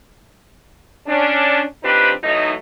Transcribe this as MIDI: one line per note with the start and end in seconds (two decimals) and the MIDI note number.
1.07 1.63 61
1.07 1.63 62
1.84 2.11 53
1.84 2.11 60
1.84 2.11 62
1.84 2.11 63
1.84 2.11 67
1.84 2.11 71
2.23 2.52 52
2.23 2.52 54
2.23 2.52 57
2.23 2.52 63